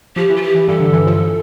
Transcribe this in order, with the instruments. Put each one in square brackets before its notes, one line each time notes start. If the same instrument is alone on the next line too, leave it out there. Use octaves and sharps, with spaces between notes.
[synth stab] F3 [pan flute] G4
[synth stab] E3
[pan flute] F4
G4
[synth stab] E3
[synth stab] G2 [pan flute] A4
[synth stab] D3
E3
F3